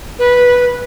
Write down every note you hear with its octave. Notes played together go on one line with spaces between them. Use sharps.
B4